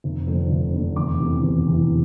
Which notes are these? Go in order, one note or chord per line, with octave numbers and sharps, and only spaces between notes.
F1
F2 D3 A3
F1
F2 D3 A3
E1 D6
E2 C3 E3
E1
E2 C3 E3